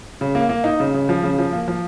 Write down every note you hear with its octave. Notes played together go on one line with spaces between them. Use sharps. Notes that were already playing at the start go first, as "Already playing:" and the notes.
C#3
A#3
A#3
D#4
C#3
C#3
F3
C#3
F3
A#3
F3